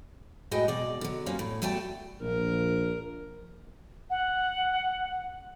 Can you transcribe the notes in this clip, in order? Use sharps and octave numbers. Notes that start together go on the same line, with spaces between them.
A2 G#3 B3 F#4 D#5 G5
B2 D5
D3 F#3
F#3 G3 A#3 C#4 F4
A2
E2 G3 A3 F#4 G5 A5
A#1 A#4
F#5